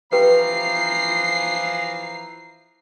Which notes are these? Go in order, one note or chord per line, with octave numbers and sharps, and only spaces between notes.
E3 F3 G4 B4 G5 A#5 C7